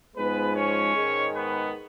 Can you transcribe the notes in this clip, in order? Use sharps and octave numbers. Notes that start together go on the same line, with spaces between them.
G#2 F3 G#3 B3 B4
C#4 C#5
G#2 D#3 G#3
B3 B4